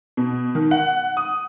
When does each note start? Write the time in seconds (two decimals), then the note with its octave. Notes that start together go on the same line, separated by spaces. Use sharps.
0.17 B2
0.55 D#3
0.71 F#5
1.17 D#6